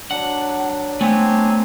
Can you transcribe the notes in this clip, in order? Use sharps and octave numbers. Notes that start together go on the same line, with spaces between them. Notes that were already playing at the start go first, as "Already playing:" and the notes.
F#3 D4 F#5
A3 B3 C4 G#5